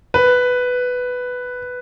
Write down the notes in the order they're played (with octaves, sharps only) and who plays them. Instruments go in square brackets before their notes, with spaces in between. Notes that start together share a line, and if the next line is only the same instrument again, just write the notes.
[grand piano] B4